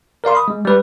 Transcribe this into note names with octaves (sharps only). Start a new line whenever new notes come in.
A#4 D5 F5 C6
B5 D#6
G#3
G3 B4